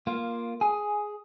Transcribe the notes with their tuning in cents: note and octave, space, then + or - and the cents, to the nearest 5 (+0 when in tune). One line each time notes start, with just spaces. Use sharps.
A#3 +5 F4 +0
G#4 +5 G#5 +0